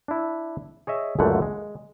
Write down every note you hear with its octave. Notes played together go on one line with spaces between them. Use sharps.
D4 E4
G#4 C#5 D#5 E5
C#2 F#2 A#2 D3 A3 F#5
G#3